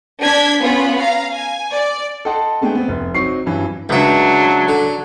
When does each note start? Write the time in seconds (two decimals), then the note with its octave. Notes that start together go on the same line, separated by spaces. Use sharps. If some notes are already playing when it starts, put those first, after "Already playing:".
0.20 D4 G#6 B6
0.61 B3 C#4 F4 B5
0.97 F5 A#5
1.30 G#5
1.73 D5
2.25 A4 D#5 F#5 G5 A5 C6
2.61 G#3 A3 B3 D4 G#4 G5
2.75 B3 C4
2.88 F1
3.14 F#3 C4 D#4 C#6 C7
3.46 G2 E3 F#3 C#4
3.89 C#2 F#3 D4 E5
4.68 D3